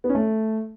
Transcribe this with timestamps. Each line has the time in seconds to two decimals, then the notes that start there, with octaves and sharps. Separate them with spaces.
0.04 B3
0.09 C#4
0.15 A3